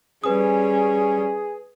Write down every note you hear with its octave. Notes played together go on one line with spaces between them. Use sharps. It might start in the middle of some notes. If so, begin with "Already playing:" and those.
G3 C#4 G#4 B4 D#6